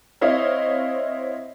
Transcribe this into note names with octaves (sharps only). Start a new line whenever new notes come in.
C4 E4 C#5 D#5 F5